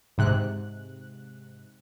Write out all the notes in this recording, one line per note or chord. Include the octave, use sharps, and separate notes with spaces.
G#2 C3 F#6